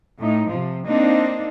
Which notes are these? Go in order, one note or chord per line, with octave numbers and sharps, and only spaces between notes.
A2 D#4
C3 F3
A#3 C4 D4 D#4